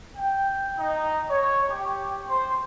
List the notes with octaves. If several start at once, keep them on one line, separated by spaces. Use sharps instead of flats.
G5
D#4
C#5
G4
C5